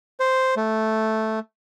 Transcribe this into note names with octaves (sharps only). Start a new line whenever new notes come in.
C5
A3